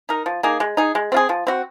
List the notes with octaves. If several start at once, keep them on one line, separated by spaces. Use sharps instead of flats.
D#4 A#4
F3
A#3 D#4 G#4
G#3
D#4 G#4
G#3
C4 F4 G#4
F3
C4 F#4